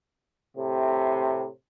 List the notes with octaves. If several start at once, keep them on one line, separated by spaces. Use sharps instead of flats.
A2 C3